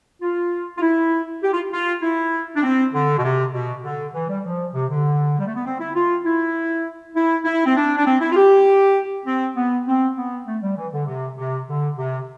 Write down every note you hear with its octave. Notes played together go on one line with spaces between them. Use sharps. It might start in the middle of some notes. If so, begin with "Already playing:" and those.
F4
F4
E4
G4
F4
F4
E4
D4
C4
D3
B2
C3
B2
D3
E3
G3
F3
C3
D3
G3
A3
B3
C4
E4
F4
E4
E4
E4
C4
D4
D4
C4
E4
F4
G4
C4
B3
C4
B3
A3
G3
E3
D3
C3
C3
D3
C3